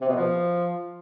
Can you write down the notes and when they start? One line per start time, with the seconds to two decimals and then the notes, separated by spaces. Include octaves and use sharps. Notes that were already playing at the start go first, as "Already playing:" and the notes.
0.01 C3
0.08 B2
0.16 F3